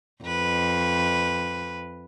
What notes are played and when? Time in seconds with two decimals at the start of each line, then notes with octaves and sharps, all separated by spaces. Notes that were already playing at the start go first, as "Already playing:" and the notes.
0.24 F2 B4